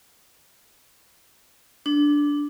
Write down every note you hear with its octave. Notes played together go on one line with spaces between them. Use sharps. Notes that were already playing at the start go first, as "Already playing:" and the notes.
D4